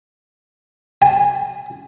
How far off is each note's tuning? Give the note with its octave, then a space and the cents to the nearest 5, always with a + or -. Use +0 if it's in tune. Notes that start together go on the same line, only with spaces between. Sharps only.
G#5 -25